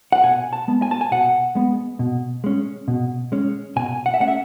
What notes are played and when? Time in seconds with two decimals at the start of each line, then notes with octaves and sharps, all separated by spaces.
0.12 F#5
0.23 B2 G#5
0.53 A5
0.68 G#3 B3
0.82 G#5
0.91 A5
1.01 G#5
1.11 B2 F#5
1.55 G#3 B3
1.99 B2
2.44 G#3 C#4
2.88 B2
3.32 G#3 C#4
3.76 B2 G#5
4.06 F#5
4.14 E5
4.20 A3 C#4 F#5
4.28 E5